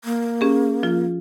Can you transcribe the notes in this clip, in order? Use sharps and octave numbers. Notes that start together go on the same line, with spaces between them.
A#3
C#4 G4 G#4
F3 F4